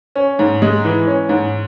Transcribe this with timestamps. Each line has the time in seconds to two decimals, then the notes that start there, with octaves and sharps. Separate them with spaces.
0.15 C#4
0.39 G#2
0.62 G#3
0.85 E3
1.07 C#4
1.29 G#2